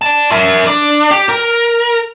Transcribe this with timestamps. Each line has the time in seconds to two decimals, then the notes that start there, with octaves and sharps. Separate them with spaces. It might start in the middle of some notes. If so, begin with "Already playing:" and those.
0.02 D5 A5
0.32 A#4 E5
0.67 D4
1.11 G4
1.29 A#4